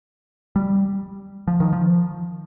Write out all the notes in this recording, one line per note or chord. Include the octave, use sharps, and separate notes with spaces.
G3
F3
D#3
F3